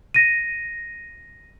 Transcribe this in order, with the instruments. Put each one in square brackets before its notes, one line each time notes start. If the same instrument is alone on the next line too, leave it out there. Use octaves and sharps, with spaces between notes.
[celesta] A#6 D#7